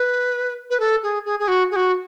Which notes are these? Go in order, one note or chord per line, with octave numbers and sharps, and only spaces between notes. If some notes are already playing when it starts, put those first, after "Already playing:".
Already playing: B4
B4
A4
G#4
G#4
G#4
F#4
G#4
F#4